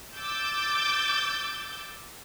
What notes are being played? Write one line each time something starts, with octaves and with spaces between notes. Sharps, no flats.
D6 E6 G6 A6